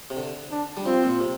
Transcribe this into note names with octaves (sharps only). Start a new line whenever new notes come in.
C3
D3
D4
G3
F3 C4
A#2
C3